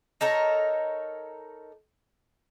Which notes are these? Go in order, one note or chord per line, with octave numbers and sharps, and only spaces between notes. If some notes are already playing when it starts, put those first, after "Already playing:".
D#4 A4 A#4 C#5